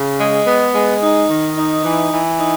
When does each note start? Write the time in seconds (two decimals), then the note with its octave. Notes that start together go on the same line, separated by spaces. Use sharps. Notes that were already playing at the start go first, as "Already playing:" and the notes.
Already playing: C#3
0.20 G#3
0.47 B3
0.75 G#3
1.03 D#4
1.30 D#3
1.57 D#4
1.84 E3
2.12 E3
2.40 D#4